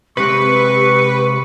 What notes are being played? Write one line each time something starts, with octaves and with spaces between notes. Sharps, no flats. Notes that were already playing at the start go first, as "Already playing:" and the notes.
C3 G#3 C4 G4 B4 C#6